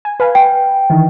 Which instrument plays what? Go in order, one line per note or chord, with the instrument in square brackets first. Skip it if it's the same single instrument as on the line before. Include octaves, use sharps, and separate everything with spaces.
[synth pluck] G#5
B4 F5 G#5
[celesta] G5
[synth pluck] D#3 E3